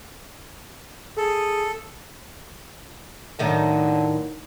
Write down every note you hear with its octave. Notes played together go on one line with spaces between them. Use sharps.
G#4 A4
A2 D3 D#3 F#3